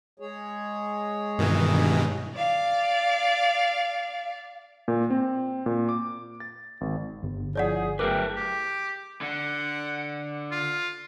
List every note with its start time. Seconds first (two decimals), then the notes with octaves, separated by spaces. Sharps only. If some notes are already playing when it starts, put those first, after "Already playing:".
0.19 G#3 G#4 C#5
1.39 G2 B2 D#3 E3
2.35 D5 F5
4.88 A#2
5.10 C4
5.66 A#2
5.89 D6
6.40 A6
6.81 G#1
7.23 G1
7.56 F3 E4 G#4 C#5 D5 F#5
7.99 F#3 A3 E4 G#4 A#4 B4 G5 D6
8.36 G4
9.22 D3 F#5
10.52 F4